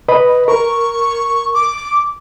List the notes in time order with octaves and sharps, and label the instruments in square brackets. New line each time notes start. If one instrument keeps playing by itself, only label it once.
[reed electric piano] B4 D#5 B5
[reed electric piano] A#4 [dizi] C#6
[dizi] D6